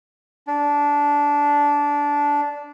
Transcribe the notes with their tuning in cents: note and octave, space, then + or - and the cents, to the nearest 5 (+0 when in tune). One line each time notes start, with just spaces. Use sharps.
D4 -15